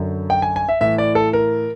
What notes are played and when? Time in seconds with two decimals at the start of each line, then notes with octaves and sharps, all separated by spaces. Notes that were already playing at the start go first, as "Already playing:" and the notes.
Already playing: F#2 D3
0.30 G5
0.42 G#5
0.56 G#5
0.69 E5
0.81 A2 E3 E5
0.98 D5
1.15 A4
1.33 A#4